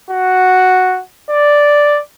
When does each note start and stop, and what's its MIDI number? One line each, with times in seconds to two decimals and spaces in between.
0.11 1.01 66
1.30 2.00 74